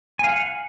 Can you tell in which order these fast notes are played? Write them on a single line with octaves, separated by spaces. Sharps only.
G#5 F5 F#5